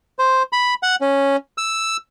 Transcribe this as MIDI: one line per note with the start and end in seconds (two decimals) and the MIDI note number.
0.19 0.43 72
0.53 0.74 83
0.83 0.96 78
1.01 1.36 61
1.58 1.97 88